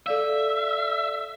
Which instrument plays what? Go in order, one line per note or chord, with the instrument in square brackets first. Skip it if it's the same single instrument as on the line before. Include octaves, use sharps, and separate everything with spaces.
[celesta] A4 D5 F5 [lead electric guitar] E5